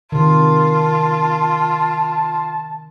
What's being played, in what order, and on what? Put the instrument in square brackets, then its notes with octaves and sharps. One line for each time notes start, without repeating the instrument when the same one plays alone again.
[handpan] C3 D#3 [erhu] F4 [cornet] A5